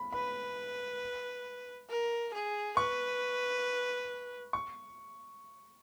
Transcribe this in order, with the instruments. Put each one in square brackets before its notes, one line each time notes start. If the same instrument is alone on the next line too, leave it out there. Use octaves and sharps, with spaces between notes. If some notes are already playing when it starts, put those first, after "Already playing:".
Already playing: [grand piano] B5
[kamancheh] B4 [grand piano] B5
[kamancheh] A#4
G#4
[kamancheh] B4 [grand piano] C#6
[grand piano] C#6